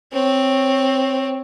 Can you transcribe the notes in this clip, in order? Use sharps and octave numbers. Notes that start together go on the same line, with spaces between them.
C4 C#5